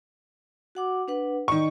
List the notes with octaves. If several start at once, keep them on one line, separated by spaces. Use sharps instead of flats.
F#4 F#5 D6
D4 B4 F#5
D#3 D5 D#5 C#6